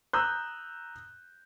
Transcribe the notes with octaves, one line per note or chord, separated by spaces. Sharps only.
A#5 D#6 E6 F#6 G6